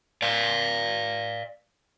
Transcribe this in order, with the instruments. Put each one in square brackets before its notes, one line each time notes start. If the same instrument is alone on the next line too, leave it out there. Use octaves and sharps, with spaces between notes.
[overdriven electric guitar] D5 F5